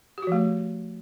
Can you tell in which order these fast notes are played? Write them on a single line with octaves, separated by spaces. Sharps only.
G4 F#4 F3 A3